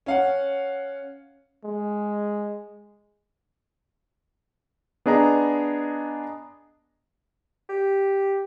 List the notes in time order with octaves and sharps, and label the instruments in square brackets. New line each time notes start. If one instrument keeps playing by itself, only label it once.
[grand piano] C#4 F5 F#5
[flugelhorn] G#3
[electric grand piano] B3 D4 G#4 D#5 A#5
[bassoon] G4